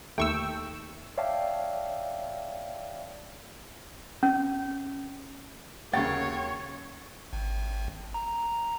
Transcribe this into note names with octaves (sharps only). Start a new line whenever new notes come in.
D#2 A3 G5 C#6 E6
C#5 D5 E5 F5 G5 A5
C#4
D#2 C#3 F#3 C#5 G5 A6
G#1
A#5